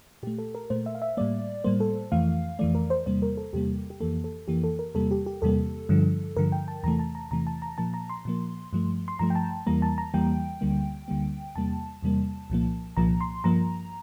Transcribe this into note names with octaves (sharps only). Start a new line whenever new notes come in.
A#2 A3 G4
A4
A#4
A#2 A3 C5
E5
F5
E5
A2 G3 A#3 D5
A2 G3 A#3 C5
A4
F2 E3 A3 F5
F2 E3 A3 D5
A#4
C5
E2 C3 G3 A#3 C5
A#4
A4
E2 C3 G3 A#3 G4
G4
F2 E3 A#3 A4
A4
F2 E3 A#3 G4
A4
A#4
E2 C3 G3 A#3 A4
G4
G4
E2 C3 G3 A#3 A4
G2 D3 F3
G2 D3 F3 A#4
G5
A5
E2 C3 E3 A3 A#5
A5
A#5
E2 C3 E3 A3 A#5
A5
A#5
A#2 F3 A#3 A5
A#5
C6
A#2 F3 A#3
G2 F3 A3
C6
G2 F3 A3 A#5
G5
A5
E2 E3 G3 A#3 A#5
A5
A#5
E2 E3 G3 A#3 G5
D2 D3 G3 A#3
D2 D3 G3 A#3
E2 C3 G3 A#3 A5
E2 C3 G3 A#3
C2 A#2 F3 A#3
C2 A#2 F3 A#3 A#5
C6
G2 F3 A#3 A#5